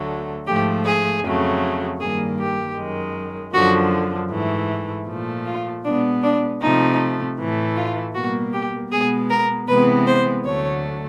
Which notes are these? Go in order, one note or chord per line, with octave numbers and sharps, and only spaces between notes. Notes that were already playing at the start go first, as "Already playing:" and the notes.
Already playing: D2 D3 F#3 A3
G#2 F3 A3 G4
G#4
F2 C#3 F#3 A3
G2 D#3 G3 A#3 G#4
G4
F#2 D#3 G#3
F#2 D3 F3 F#4
G#2 E3 A3
A#2 F3 A3
F4
B2 G#3 B3 D4
D4
C3 F3 A3 D#4
A2 E3 A3
F4
B2 G3 A#3 F#4
G4
B2 G#3 B3 G#4
A#4
C3 E3 G#3 B3 B4
C5
D2 D3 F#3 A3 C#5